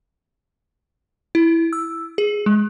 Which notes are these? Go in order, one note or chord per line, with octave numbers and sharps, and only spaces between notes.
E4
E6
G#4
G#3